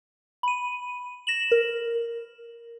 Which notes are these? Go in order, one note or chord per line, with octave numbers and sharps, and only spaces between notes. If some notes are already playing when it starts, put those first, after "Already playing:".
B5 D#7
A#6 E7 F#7
A#4